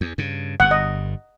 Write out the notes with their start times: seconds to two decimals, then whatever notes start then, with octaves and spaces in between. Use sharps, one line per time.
0.01 E2
0.18 G2 C#3
0.60 G1 G2 F#5
0.71 D#5